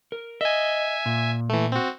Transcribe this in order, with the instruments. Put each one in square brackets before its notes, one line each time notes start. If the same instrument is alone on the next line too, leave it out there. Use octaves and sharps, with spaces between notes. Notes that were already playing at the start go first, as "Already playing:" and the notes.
[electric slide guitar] A#4
[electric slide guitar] D#5 [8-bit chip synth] E5 G#5
[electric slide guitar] A#2
[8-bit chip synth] E3 A3
C4 F#4